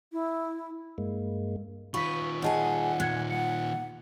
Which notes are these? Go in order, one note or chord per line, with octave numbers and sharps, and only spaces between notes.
E4
G2 G#3 A#3
D#3 F4 B4 C#6 B6
A#2 G#4 C#5 D#5 F#5 G#5 A5
A#2 F#6 G#6 C#7
F#5 C#7